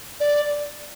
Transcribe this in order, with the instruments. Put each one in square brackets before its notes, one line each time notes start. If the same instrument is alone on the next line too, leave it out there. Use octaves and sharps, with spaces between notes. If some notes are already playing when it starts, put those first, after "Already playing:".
[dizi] D5